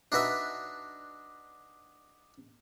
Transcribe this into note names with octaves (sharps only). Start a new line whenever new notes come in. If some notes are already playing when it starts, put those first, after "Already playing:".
D4 D#4 F#4 B4 E5